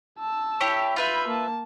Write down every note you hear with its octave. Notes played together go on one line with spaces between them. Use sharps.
A5 E6
E4 G4 C#5
F4 B4 E5 B5 G6
A#3 A5